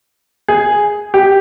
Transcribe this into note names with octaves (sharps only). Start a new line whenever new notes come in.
G#4
G4